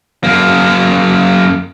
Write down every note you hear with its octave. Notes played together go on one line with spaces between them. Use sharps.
F#2 A#3